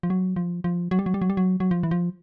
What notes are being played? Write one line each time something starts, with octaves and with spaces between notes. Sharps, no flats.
F3
F#3
F3
F3
F#3
G3
F#3
G3
F#3
G3
F#3
F#3
F3
E3
F3